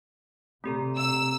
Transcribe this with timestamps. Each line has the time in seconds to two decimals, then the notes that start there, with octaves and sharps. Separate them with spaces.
0.64 C3 A3 C4 G4 A4 A#5
0.97 E6